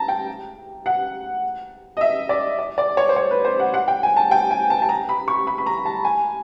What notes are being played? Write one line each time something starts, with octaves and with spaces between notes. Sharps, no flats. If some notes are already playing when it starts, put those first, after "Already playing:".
Already playing: A5 A#5
G5
F#5
D#5
E5
D5
D5
D5
C#5
C5
C#5
B4
C5
F#5
F#5
G5
G#5
A5
G5
G#5
A5
A5
A#5
B5
C#6
B5
B5
A#5
A5
G#5